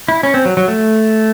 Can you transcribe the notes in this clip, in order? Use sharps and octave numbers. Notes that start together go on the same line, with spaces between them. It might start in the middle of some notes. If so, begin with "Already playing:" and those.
E4
C#4
C4
F#3
F#3
A3